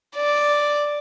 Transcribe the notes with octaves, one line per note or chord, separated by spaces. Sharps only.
D5